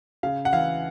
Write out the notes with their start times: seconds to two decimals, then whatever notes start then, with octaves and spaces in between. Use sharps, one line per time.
0.23 C#3 F5
0.45 F#5
0.52 E3 F5